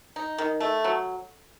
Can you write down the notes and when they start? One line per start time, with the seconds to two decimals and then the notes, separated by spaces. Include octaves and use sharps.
0.16 D#4
0.38 D#3
0.60 A3
0.84 F#3